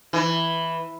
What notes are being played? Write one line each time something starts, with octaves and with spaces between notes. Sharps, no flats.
E3